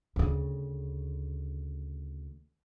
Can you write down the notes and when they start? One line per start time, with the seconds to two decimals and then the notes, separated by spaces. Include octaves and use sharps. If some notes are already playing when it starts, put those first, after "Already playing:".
0.16 D2 C#3